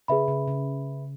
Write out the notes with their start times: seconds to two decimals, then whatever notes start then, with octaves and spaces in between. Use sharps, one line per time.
0.08 C#3 G#4 B4 E5 B5
0.28 C#3
0.48 C#3